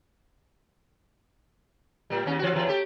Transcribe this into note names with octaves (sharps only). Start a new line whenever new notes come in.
A2 G3
D#2 C#4
E3 F#4
E2 E3
A3 G4